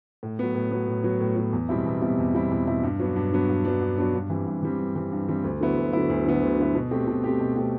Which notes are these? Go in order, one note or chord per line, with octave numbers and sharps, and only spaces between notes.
A2
F#3 B3
A2
F#3 B3
A2
F#3 B3
A2
F#3 B3
E2
B2 G3 C4 E4
E2
B2 G3 C4 E4
E2
B2 G3 C4 E4
E2
B2 G3 C4 E4
G2
F#3 B3 D4
G2
F#3 B3 D4
G2
F#3 B3 D4
G2
F#3 B3 D4
G2
E3 G3 C4
G2
E3 G3 C4
G2
E3 G3 C4
G2
E3 G3 C4
D2
D3 F#3 B3 E4
D2
D3 F#3 B3 E4
D2
D3 F#3 B3 E4
D2
D3 F#3 B3 E4
B2
A3 C4 G4
B2
A3 C4 G4
B2
A3 C4 G4